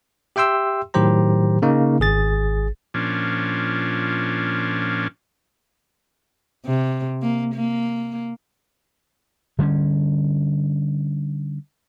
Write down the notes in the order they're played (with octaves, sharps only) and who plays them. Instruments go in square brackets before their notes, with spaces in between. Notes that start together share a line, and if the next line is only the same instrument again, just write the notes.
[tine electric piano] G4 E5 G5 C6 E6
A2 D#3 F#3 G4 C5 A#5
C#3 A#3 D#4
G#1 G#4 A6
[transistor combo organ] A#2 F3 C#4 D4
[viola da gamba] C3
A#3
A#3
[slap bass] D3 G3 A#3 C#4